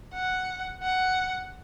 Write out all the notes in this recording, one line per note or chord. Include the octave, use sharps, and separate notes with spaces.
F#5
F#5